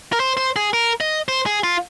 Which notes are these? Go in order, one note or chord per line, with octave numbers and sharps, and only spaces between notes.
A#4
C5
C5
G#4
A#4
D#5
C5
G#4
F4